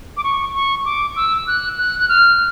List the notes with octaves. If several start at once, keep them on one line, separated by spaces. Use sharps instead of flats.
D6
C#6
C#6
D6
E6
F#6
F#6
F#6
F6